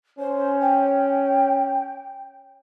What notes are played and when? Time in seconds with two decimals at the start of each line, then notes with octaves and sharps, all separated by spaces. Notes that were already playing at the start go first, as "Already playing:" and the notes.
0.19 C#4 C5
0.60 G5